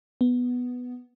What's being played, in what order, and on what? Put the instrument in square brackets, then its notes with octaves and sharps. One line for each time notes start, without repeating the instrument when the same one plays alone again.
[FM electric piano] B3